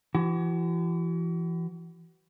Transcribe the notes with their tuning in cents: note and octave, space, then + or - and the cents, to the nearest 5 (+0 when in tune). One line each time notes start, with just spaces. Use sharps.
E3 +40 F#4 +45